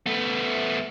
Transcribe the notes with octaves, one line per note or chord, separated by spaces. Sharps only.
A3 B3